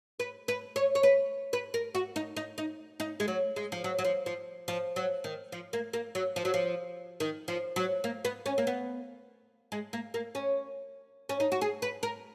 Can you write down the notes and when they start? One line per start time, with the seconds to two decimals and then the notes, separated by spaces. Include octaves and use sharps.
0.20 B4
0.48 B4
0.76 C#5
0.95 C#5
1.03 B4
1.53 B4
1.74 A#4
1.95 F#4
2.16 D#4
2.36 D#4
2.58 D#4
3.00 D#4
3.20 G#3
3.28 F#3
3.56 G#3
3.72 F3
3.84 F#3
3.98 F#3
4.05 F3
4.26 F3
4.68 F3
4.96 F#3
5.24 D#3
5.52 F3
5.73 A#3
5.93 A#3
6.15 F#3
6.36 F3
6.45 F#3
6.54 F3
7.20 D#3
7.48 F3
7.76 F#3
8.04 A#3
8.25 B3
8.46 C#4
8.58 A#3
8.67 B3
9.72 G#3
9.93 A#3
10.14 A#3
10.35 C#4
11.29 C#4
11.40 D#4
11.52 F#4
11.61 G#4
11.82 B4
12.03 A#4